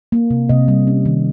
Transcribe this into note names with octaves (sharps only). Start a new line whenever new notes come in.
A#3
C3
C3 D#5
G3
C#4
D#3